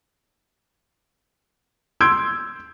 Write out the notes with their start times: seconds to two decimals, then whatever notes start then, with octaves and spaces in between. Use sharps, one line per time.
2.00 C6 E6 G6 G#6 D7